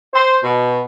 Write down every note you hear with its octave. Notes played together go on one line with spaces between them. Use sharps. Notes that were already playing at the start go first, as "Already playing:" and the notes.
C5
B2